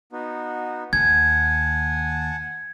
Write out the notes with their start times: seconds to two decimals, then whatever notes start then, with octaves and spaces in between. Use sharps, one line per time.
0.13 B3 D#4 F#4
0.93 D#2 F#5 G#5 A5 G#6